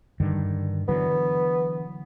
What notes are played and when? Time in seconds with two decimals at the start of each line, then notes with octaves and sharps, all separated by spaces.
0.20 G2 D3 D#3
0.88 D3 E3 F#3 B3